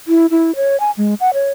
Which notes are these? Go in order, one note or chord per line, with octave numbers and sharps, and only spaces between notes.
E4
E4
C#5
G#5
G#3
F#5
C#5